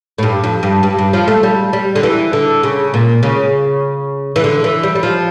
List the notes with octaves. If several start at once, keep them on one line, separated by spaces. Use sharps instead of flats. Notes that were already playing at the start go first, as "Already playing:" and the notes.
A2
G2
F2
G2
G2
G2
F3
A3
G3
G3
D3
E3
D3
C#3
A#2
C#3
E3
D3
E3
G3
G3
F3